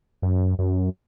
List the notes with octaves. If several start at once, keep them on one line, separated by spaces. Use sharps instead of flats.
F#2
F#2